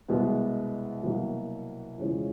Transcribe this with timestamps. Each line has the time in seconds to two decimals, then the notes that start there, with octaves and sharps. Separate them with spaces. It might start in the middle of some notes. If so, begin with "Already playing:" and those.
0.08 C2 B2 G#3 B3
1.03 C2 B2 F#3 A#3
1.98 F2 C#3 E3 G#3 C#4